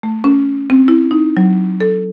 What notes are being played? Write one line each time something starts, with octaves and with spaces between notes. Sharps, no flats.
A3
C#4
C4
E4
D#4
F#3
A4